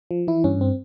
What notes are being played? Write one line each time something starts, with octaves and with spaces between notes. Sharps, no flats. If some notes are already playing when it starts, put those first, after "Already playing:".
F3
E3 E4
G2 C#4
C4